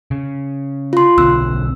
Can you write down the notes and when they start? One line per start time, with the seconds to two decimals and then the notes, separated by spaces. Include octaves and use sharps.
0.11 C#3
0.93 F4 C6
1.18 B1 D3 C4 E6 F#6